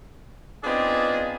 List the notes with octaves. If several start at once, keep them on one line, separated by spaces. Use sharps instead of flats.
B3 C4 D4 D#4 F4 G#4